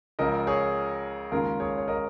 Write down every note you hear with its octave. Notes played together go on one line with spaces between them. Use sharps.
C#2 C#3 F3 A#4 D#5
G#4 C#5
D#2 C#3 G#3 C#4 F4 A#4
G#4 C#5
C#5
A#4 D#5